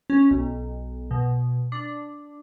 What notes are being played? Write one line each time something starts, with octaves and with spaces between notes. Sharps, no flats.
C#4
B1
B2
D4